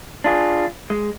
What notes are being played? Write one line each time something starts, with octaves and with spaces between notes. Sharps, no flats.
D4 F4 G#4
G#3